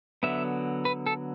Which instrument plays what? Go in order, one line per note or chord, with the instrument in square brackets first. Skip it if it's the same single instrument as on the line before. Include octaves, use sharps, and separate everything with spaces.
[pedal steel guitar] D3 F#3 B3 E5
B4
A4